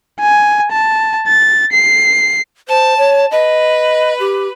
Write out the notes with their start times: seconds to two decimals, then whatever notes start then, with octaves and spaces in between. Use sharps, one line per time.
0.20 G#5
0.72 A5
1.27 A6
1.73 C7
2.68 C5 A5
2.98 C#5
3.31 B4 D#5
4.19 G4